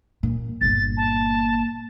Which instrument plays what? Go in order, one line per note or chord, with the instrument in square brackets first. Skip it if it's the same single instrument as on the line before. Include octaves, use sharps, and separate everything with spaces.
[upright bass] A#2
[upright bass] G1 A#2 [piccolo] A6
[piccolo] A5